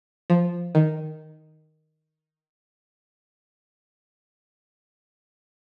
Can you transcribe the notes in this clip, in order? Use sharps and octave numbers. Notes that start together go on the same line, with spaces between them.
F3
D#3